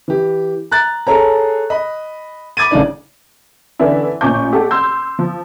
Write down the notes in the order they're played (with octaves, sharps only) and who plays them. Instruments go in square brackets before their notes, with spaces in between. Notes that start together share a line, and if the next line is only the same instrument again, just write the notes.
[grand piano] E3 G4
A#5 F#6 A6
G#4 A4 C#5 A#5
D#5 B5
B5 D6 G#6 A6 D#7
A1 C#3 D4 D#4 D5
[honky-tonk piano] D3 E3 B3 C#4 D4 E4
A1 A#2 C#4 C#6 D6 G6
G4 A4 F#5
C6 E6 G6
F3